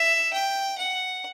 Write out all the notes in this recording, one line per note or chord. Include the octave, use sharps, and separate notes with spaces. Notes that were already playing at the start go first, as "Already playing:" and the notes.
Already playing: E5
G5
F#5